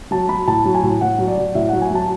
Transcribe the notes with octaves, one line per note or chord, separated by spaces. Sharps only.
F#3 A5
F#3 B5
A2 A5
F#3
G#5
A2
A2 F#5
F#3
D5
F#3
A2 E5
F#3 F#5
G#5
F#3 A5